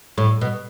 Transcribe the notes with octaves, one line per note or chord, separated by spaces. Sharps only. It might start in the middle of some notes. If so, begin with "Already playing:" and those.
A2
B2